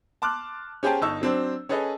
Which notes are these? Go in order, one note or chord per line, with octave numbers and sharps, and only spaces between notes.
A5 C6 D6 F6 F#6
C#4 G4 G#4 C5 G5 A5
G1 D#4 A5 C#6 E6
F#3 C4 D4 C5
C#4 G#4 A4 B4 D#5